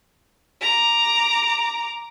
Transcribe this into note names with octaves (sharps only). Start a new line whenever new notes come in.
A#5 D6